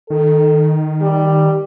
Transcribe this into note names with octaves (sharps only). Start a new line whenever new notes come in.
D#3 A4
G3